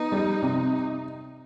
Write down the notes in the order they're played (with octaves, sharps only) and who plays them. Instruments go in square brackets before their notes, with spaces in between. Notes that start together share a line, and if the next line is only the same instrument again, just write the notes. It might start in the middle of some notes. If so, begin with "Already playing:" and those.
Already playing: [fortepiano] B3 [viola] D#4
[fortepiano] G3
C3